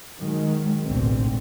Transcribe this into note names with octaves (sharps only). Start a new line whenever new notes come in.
D#3 F#3 G#3
A1 D2 G#2 B2 D3 C4